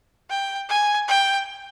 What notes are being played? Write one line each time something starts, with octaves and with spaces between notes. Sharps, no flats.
G5
G#5
G5